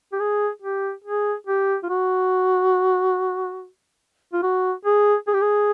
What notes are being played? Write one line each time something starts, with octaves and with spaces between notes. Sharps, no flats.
G4
G#4
G4
G#4
G4
F4
F#4
F4
F#4
G#4
G#4
G4
G#4